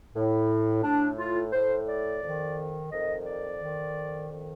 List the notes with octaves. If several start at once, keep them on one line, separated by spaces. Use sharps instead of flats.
A2
A2 D4
F4
A2 C5
D5
F2 D#3
F2 D#3 D#5
D5
F2 D#3
F2 D#3